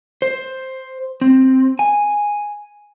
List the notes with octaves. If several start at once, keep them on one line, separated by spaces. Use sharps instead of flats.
C5
C4
G#5